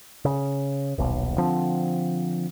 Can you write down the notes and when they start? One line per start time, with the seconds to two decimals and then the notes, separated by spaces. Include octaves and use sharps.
0.25 C#3
0.98 D#1 B1
1.38 D3 F3 C4